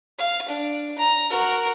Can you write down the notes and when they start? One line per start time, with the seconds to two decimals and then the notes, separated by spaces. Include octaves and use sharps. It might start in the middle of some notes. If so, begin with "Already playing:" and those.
0.19 F5
0.48 D4
0.99 A#5
1.30 F#4 A#4